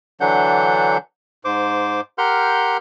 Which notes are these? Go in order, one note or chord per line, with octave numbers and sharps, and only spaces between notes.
D3 E3 F#3 D4 F#5 G6
G#2 C5 D6
G4 A#4 F#5 C6 F6 G6